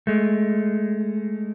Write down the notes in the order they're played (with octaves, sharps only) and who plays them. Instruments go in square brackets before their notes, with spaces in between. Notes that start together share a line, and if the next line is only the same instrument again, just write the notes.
[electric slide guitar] G#3 A3